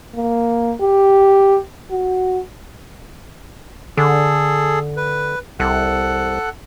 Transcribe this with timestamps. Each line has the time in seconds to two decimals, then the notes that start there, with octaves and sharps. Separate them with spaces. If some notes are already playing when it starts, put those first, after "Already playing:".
0.15 A#3
0.81 G4
1.91 F#4
3.97 D3 G#4 A4
4.97 B4
5.60 C2 A4 F#5 F#6